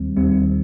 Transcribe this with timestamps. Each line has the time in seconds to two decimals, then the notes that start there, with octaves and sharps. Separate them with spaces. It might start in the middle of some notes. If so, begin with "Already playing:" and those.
Already playing: D#2 D#3 G3 C4
0.16 D#2 D#3 G3 C4